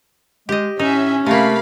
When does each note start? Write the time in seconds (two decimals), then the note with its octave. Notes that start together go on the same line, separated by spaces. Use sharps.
0.49 G#3 G4 D#5
0.79 A2 C#4 D#4 E5 G#5
1.26 C3 A3 A#3 F5 B5